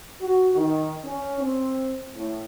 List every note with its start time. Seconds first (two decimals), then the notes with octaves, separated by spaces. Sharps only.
0.21 F#4
0.55 D#3
1.04 C#4
1.41 C4
2.15 A2